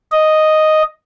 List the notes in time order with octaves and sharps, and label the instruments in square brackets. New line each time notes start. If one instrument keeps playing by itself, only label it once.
[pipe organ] D#5